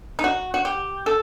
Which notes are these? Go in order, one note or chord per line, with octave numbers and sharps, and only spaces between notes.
D#4
F#4
F#4
G4
A4